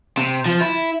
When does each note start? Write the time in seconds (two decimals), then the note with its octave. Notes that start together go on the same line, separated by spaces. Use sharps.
0.17 C3
0.46 F3
0.61 E4